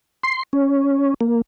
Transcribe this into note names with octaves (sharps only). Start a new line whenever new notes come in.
C6
C#4
A#3